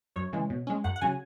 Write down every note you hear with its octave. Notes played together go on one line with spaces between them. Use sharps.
F#2 C#5
C#3 E3 G#3
B2
G#3 C#4
F#2 F#5
F#5
C#3 F#3 C#4 G#5